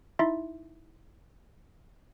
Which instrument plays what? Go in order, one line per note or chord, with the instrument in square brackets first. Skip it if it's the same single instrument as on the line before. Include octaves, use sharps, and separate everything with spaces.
[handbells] D#4 E4 E5 C6 A6